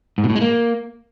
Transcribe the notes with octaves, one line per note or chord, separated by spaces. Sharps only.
G#2
B2
A2
G#3
A#3